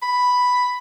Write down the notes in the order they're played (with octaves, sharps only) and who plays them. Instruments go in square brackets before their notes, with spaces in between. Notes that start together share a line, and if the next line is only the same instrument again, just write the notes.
[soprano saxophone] B5